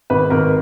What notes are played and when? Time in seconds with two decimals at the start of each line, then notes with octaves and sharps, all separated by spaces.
0.10 G#1 B4
0.30 G#1 A#4